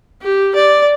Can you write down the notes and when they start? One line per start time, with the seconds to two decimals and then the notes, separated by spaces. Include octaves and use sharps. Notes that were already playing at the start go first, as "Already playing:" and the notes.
0.22 G4
0.55 D5